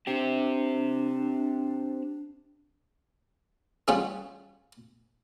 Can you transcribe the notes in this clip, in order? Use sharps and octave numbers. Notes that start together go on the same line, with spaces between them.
C4 D4 G4
G3 C#4 F4 F#4 G#4